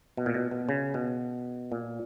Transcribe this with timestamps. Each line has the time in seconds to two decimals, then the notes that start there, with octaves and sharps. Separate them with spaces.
0.17 B2
0.26 A#2
0.34 B2
0.51 B2
0.69 C#3
0.94 B2
1.72 A#2